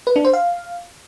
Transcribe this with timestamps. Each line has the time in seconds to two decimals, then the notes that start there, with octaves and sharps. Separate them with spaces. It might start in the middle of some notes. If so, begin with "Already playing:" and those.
0.07 B4
0.16 D4
0.25 C5
0.33 F5